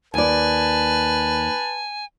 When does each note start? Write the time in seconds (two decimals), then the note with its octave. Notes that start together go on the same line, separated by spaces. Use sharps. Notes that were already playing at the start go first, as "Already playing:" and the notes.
0.14 D#2 B4 D5 G#5 A5